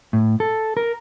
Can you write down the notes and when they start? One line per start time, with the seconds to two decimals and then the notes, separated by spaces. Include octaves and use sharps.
0.13 A2
0.40 A4
0.77 A#4